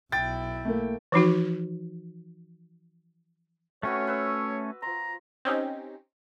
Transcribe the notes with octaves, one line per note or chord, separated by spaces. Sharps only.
B1 E4 G5 A6
A3 A#3 A#4
E3 F3 D#4 F#4
A3 C4 C#4 F#4 B4 C#5
B4 E6
F3 A#5 C6
C4 C#4 D#4 G4